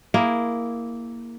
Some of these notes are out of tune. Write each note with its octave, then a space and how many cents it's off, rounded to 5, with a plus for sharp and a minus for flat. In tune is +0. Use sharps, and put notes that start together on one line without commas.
A#3 +0 E4 +0 G#4 -10